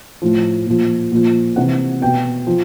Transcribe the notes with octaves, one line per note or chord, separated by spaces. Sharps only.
A2 F3
A#2 F3
A#2 F3
C3 E3 F#5
B2 G5
F3